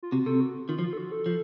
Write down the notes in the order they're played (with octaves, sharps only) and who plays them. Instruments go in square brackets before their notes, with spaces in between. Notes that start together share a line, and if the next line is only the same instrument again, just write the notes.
[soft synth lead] F4
[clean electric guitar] C3 [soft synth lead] F#4
[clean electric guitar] C3 [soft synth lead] A4
[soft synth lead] F#4
[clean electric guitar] D#3 [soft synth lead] F4
[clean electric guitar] F3
[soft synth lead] F4
A4
F#4
A4
[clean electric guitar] F3